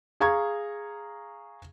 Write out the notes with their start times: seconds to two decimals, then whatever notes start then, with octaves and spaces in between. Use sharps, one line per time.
0.20 G#4 F5 A#5 C#6 G#6